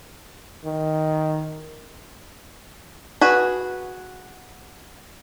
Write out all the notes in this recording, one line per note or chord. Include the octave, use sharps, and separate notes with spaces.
D#3
F#4 G#4 B4